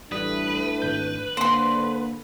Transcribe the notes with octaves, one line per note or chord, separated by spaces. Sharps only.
A1 A2 G3 A3 D4 B4 D#6
G#1 G6
D3 A#3 C5 C6